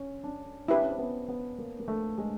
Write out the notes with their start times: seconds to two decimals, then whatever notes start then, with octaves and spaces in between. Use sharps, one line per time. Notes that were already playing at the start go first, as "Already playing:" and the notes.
Already playing: C#4
0.24 D4
0.68 D4 E4 G4 B4
0.81 C#4
0.90 C4
0.98 B3
1.28 B3
1.58 A#3
1.80 A#3
1.88 A3
2.18 G#3